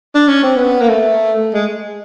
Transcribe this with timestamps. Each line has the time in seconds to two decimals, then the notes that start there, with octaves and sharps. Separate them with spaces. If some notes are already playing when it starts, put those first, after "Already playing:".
0.15 D4
0.28 C#4
0.43 C4
0.56 B3
0.81 A#3
0.89 A3
1.54 G#3